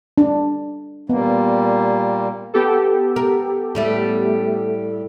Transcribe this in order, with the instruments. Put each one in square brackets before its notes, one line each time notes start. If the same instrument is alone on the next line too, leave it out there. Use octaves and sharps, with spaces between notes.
[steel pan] D4
[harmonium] A#2 G3 A#3 [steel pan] B3
[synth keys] B3 G4 A4
[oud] A#4
A2 G3 A3